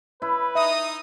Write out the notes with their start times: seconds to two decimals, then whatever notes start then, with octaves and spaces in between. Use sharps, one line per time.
0.22 E4 B4
0.55 D#4 E5 D#6